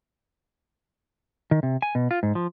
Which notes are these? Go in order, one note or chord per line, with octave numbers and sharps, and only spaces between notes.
D#3
C3
G#5
B2
F4
G#2
F3